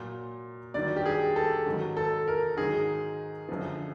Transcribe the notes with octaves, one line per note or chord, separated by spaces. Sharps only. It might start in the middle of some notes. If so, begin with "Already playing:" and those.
Already playing: A#2 F#3
G2 D#3 F#3 D5
G4
G#4
A4
G#2 D#3 F#3
A4
A#4
G#2 D#3 F#3 G#4
F#2 D3 F3